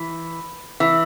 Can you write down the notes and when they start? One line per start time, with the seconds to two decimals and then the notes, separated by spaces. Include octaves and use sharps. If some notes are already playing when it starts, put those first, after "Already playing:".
Already playing: E3
0.80 E3